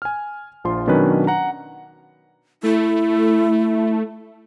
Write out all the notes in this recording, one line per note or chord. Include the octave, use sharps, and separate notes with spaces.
G#5 F6
A#1 F3 F4 C6
B2 D#3 F#3 C#4 D4 B4
F#5 A#5
A3 E4